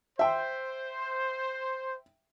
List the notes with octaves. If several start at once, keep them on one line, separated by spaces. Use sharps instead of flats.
C5 E5 G5